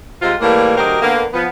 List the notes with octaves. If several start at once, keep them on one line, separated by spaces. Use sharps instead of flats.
C3 G#3 C4 F4
A2 E3 G3 A#3
D2 F#3 G4 A#4 C5 D#5
D3 A#3 B3
F3 B3